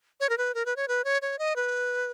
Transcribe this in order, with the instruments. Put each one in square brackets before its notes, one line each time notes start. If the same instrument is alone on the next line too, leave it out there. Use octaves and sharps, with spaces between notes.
[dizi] C#5
A#4
B4
A#4
B4
C#5
B4
C#5
C#5
D#5
B4